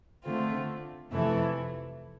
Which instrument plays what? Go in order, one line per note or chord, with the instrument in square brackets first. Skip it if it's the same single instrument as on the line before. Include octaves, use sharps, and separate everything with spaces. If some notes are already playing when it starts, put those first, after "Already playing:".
[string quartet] D3 A3 C4 F4
F2 C3 E3 A3 E4